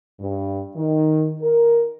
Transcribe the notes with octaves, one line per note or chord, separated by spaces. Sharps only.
G2
D#3
A#4